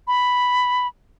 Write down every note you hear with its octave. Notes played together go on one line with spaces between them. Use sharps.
B5